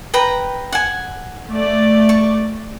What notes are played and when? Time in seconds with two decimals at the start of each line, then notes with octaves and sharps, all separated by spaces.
0.14 B4 G5 A#5
0.72 F#5 G#5
1.50 A3 D5
2.09 C#6